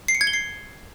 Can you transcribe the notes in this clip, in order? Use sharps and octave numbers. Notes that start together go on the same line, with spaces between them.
C7
C#7
G#6
G7
C7